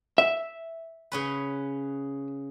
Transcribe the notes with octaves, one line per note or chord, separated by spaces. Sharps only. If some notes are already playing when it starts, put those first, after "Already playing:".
E5
C#3 C#4 B4